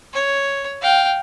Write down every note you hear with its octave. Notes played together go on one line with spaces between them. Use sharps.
C#5
F5 G5